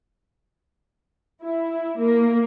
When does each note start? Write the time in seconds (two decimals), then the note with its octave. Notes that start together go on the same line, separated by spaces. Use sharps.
1.42 E4
1.98 A#3